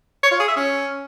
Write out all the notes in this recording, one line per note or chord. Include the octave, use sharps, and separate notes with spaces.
C#5
F4
G#4
E5
C#4